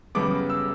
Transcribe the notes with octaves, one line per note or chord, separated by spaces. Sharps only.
F#2 C#3 G3 B3 D6
E6